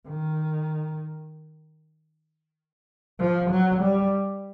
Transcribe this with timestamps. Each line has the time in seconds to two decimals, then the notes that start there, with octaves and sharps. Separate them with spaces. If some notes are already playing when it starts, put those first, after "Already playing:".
0.08 D#3
3.19 F3
3.50 F#3
3.82 G3